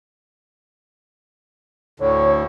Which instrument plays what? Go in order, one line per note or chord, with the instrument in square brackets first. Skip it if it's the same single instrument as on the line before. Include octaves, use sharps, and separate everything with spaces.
[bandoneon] D2 A2 D3 [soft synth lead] C#5